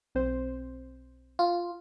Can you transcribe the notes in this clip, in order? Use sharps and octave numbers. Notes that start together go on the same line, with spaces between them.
B1 C4 C5
F4